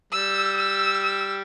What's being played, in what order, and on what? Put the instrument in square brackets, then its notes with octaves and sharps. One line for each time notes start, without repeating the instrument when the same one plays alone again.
[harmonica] G3 [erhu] E6
[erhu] E6
E6